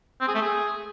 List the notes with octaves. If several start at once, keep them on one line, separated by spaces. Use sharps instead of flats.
C4
G#4
A3
G#4